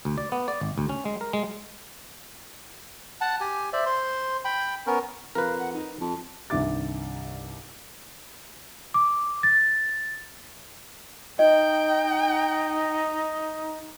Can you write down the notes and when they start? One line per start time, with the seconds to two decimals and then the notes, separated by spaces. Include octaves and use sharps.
0.05 D2
0.18 D5
0.32 B3
0.48 D5
0.61 G#1
0.78 D2
0.89 C#4
1.05 G#3
1.21 A#4
1.33 G#3
3.21 F#5 A5
3.40 G4 G#5
3.73 C5 D5 E5
3.86 C5 C6
4.45 G5 B5
4.87 B3 C#4 A#4
5.35 F2 A#4 B4 F5
5.58 F#5
5.73 D#4
6.01 F2 A5
6.50 C2 G2 D#3 E5 D6 A6
8.94 D6
9.43 A6
11.39 D#4 D#5 G5